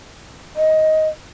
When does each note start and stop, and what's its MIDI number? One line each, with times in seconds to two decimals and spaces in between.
0.56 1.08 75